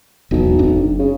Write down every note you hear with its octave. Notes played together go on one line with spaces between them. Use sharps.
E1 B1 E2
F#1 C4 D4
C#3